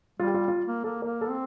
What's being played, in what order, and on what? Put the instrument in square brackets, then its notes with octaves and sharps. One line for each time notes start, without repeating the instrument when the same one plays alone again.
[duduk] G3 [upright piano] F4
[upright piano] G4
F4
F4
[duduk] A#3
[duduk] A#3 [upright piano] A4
[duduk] A#3 [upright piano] A#4
[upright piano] A4
[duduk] C4